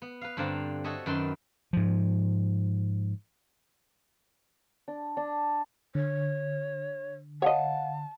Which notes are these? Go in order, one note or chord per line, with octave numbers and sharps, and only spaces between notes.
B3
B4 F5
G2 D3 C4 F5 A5 A#5
F#4 A4 C#5 D#5 E5
F#2 D#3 B4 A5 C6
G#2 F3
D4
D4
D3 C#5
C#5 D#5 F5 F#5 A5